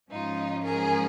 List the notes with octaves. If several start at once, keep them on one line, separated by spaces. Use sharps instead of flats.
G#2 F3 G#3 C#4 D#4 F4
G#4 A#4